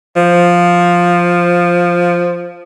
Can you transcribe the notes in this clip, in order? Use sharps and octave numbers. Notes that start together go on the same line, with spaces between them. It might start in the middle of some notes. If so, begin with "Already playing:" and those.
F3